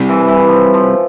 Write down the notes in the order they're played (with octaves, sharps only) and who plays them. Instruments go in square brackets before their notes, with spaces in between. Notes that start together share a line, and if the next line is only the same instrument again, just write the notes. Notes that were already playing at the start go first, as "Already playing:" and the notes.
Already playing: [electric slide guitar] G3 C4 E4 G4
[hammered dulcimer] E3
E3
F3
F3